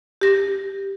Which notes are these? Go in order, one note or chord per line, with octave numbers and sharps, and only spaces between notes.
G4 A#6